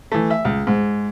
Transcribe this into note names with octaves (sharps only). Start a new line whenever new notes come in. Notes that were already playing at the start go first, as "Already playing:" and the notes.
E3 A3
E5
C#2
G#2